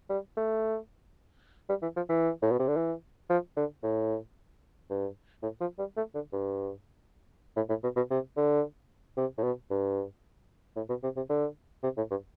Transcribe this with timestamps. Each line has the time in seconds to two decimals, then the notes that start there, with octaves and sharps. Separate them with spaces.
0.10 G3
0.37 A3
1.69 G3
1.82 E3
1.96 F3
2.09 E3
2.42 A2
2.51 B2
2.59 C3
2.68 D3
2.77 E3
3.30 F3
3.57 D3
3.83 A2
4.90 G2
5.43 A2
5.60 F3
5.79 G3
5.97 A3
6.15 D3
6.33 G2
7.56 A2
7.69 A2
7.83 B2
7.96 B2
8.10 C3
8.37 D3
9.17 C3
9.38 A2
9.43 B2
9.70 G2
10.76 A2
10.89 B2
11.03 C3
11.16 C3
11.29 D3
11.83 C3
11.97 A2
12.10 G2